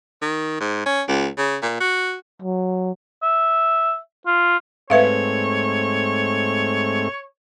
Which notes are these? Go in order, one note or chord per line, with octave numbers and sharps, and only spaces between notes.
D#3
G#2
C#4
C#2
C#3
A#2
F#4
F#3
E5
F4
G#2 A3 C4 B4 C#5 E5 F5